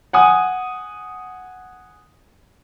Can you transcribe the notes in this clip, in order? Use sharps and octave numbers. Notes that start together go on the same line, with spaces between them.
F#5 G#5 D#6